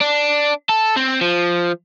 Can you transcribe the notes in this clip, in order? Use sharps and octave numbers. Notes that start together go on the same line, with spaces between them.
D4
A4
C4
F3